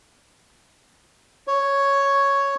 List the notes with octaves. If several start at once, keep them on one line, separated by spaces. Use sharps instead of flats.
C#5